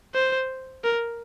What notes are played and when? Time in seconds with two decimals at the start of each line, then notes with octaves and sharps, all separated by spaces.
0.14 C5
0.84 A#4